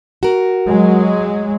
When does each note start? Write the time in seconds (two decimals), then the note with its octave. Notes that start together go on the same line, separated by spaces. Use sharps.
0.23 F#4 A#4
0.68 F#3 G#3